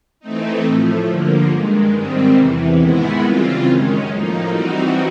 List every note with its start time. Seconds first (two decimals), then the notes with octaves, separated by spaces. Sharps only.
0.20 E3 A3 C4 D#4
0.63 A2 F3 A3
1.06 G2 D3 F3 A#3
1.49 G2 D#3 G#3
1.92 G#2 D#3 G3 C4
2.35 E2 C3 E3
2.78 G#2 D#3 G#3 B3 E4
3.22 C#3 E3 G3 C4 F4
3.64 F#2 D#3 G#3 C#4
4.07 A2 F3 A#3 D#4
4.51 E3 G3 C4 D#4 F#4